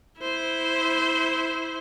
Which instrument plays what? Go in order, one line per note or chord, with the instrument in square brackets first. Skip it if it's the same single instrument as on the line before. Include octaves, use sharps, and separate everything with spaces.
[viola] E4 C5